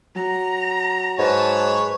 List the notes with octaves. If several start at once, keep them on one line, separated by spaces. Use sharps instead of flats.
F#3 A#5
G#2 B4 C#5 A5